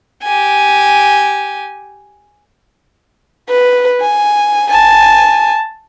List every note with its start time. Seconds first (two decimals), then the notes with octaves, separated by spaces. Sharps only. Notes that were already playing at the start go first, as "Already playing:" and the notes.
0.24 G4 G#5
3.49 B4
4.02 G#5
4.70 G#5 A5